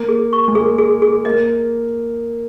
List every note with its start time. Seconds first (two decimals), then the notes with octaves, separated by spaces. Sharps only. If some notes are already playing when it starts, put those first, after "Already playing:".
Already playing: A#3
0.09 G#4
0.33 C#6
0.48 G#3
0.55 A#3 G#4
0.78 G#4
1.02 G#4
1.25 A#3 D#5